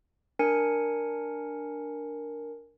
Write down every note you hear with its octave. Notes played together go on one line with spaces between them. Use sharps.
D4 A#4 G#5 C#7